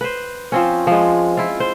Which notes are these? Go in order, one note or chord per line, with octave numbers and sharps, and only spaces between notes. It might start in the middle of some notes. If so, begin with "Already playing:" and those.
B4 C5
F3 C4 C#4
F3 G#3
E4 F4
C5